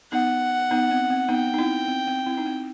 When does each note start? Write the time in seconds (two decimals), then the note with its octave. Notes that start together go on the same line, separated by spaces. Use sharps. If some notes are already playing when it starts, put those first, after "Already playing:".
0.12 B3 D#4 F#5
0.71 B3 D#4
0.91 C4
1.10 C4
1.29 B3 D#4 G5
1.54 D#4
1.58 C4 E4
1.88 C4
2.08 C4
2.26 C4 E4
2.37 D#4
2.46 C4